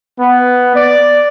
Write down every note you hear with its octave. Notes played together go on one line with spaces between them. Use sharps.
B3
D5